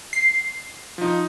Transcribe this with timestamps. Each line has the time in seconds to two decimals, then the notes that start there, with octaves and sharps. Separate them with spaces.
0.13 C7
0.98 F3 D#4